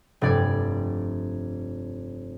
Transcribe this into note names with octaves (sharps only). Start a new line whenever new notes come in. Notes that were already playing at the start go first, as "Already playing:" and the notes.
F1 G2 D5 D6 G#6